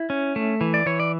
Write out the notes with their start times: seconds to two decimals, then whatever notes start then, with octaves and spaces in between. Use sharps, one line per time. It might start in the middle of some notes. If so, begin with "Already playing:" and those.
Already playing: E4
0.10 C#4
0.36 A3
0.61 E3
0.74 D5
0.86 E3 C#5
1.00 D5